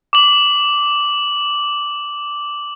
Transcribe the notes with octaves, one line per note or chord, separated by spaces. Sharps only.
D6 F#7